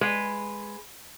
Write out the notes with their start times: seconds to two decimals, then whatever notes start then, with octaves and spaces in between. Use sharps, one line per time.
0.01 G#3 B4